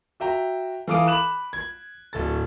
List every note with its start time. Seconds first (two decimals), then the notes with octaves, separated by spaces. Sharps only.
0.20 F#4 E5 G5 A#5
0.88 E3 A4 F5 D6 D#6 D7
1.06 B5 D6 F#6 E7 F#7
1.53 G#6
2.13 D1 A4 A6